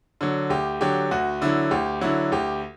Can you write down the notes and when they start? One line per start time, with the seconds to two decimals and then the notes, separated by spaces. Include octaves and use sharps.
0.21 D3 F#3
0.50 D2 G4
0.81 D3 F#3 G4
1.11 D2 F#4
1.42 D3 F#3 E4
1.71 D2 G4
2.01 D3 F#3 E4
2.32 D2 G4